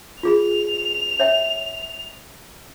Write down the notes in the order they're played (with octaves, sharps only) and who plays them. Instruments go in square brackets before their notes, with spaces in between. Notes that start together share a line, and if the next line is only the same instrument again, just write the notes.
[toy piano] F4 G#4 B5 [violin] F7
[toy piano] C#5 E5 G5